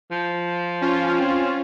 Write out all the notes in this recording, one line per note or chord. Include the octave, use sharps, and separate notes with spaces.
F3
C#4 F4
C4